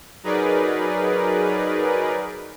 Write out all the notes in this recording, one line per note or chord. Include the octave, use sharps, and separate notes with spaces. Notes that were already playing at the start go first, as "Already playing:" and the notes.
F#3 D#4 G#4 A#4 B4 D5